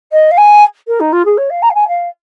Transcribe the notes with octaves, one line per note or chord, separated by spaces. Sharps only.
D#5
F5
G#5
A#4
D#4
F4
G#4
C#5
F5
A#5
F5
G#5
F5